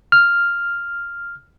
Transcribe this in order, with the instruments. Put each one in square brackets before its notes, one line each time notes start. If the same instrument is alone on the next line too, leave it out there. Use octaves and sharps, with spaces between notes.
[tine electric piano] F6